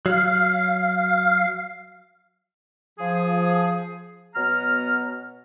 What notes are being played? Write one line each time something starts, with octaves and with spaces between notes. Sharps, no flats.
F#3 F5
F3 G#4
B2 F#3 B3 A#5 F6